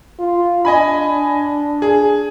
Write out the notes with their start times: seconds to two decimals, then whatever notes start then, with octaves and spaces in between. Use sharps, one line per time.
0.19 F4
0.65 D4 D#5 G#5 B5
1.82 G#4